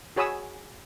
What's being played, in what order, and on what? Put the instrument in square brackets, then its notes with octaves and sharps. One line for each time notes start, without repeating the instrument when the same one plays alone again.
[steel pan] F#4 G#4 C#5 B5 D#6 E6